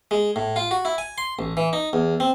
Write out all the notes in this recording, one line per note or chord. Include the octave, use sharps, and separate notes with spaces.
G#3
A2
F4
F#4
E4
G#5
C6
A1
E3
D#4
E2
C4